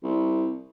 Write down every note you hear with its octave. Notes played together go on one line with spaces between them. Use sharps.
C2